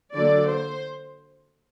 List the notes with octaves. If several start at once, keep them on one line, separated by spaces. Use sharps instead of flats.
D3 F#3 A#3 D5
C5